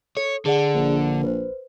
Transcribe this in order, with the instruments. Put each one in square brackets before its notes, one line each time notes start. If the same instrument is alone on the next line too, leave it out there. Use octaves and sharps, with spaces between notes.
[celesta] A4 [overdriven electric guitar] C#5
[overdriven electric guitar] D3 [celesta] G#4 D5 F#5
[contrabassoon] A#1
[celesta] B4 C5